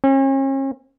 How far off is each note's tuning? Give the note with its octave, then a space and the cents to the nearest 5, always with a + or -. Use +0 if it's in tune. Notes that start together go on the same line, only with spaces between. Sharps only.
C#4 -40